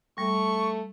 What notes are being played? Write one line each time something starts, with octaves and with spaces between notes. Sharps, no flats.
G3 A3 C#6